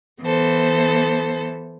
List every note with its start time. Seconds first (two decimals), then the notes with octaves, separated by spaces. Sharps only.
0.22 E3 B3 A4 C5